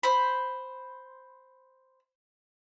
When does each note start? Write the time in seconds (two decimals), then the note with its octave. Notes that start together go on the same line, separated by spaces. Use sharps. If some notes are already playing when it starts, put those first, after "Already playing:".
0.03 C5 B5